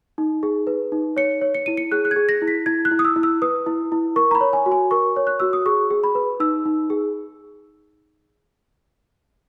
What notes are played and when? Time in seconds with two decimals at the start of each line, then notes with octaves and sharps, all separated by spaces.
0.18 D#4
0.43 G#4
0.67 B4
0.92 D#4
1.17 C#5 C#7
1.41 C#5
1.55 C#7
1.66 E4 D#7
1.77 C#7
1.91 G#4 F#6
2.05 F#6
2.11 G#6
2.16 G#4
2.29 A#6
2.42 E4
2.48 B6
2.66 E4 G#6
2.85 F#6
2.91 E4
2.99 D#6
3.05 E6
3.16 E4
3.23 E6
3.42 B4 D#6
3.66 E4
3.92 E4
4.16 A#4 C#6
4.31 A#5
4.35 B5
4.41 C#5
4.53 G#5
4.66 F#4
4.72 G#5
4.91 A#4 C#6
5.16 C#5
5.27 F#6
5.40 F#4 E6
5.53 D#6
5.66 G#4 C#6
5.91 G#4
6.04 B5
6.15 B4
6.40 D#4 E6
6.66 D#4
6.90 G#4